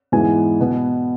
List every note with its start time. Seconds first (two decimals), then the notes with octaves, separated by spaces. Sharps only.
0.12 G#2 E3 G#3 B3 G#5
0.60 B2 B3